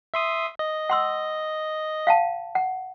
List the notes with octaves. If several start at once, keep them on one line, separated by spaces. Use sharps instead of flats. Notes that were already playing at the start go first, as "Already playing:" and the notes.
E5 C6 D#6
D#5
F#5 C6 E6
F5 F#5 A5
F#5